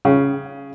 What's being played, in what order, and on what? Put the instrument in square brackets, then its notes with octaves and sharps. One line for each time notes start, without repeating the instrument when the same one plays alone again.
[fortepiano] C#3